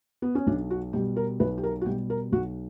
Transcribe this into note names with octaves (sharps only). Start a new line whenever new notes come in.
B3
C#4
B1 D4
F#4
B2 G3 G4
A#4
B1 B4
G4
A#4
F#4
B2 G3 G4
A#4
B1 F#4